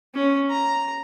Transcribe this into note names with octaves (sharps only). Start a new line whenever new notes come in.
C#4
A#5